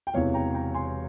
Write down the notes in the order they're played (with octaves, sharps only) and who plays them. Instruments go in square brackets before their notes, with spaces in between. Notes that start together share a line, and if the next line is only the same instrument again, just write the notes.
[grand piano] G5
E1 E2 C3 E3 C#5 F5
G5 A#5
G5 A#5
G#5 C6